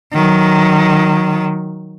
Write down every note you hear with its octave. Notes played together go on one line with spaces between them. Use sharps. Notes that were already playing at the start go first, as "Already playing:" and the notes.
D#3 F#3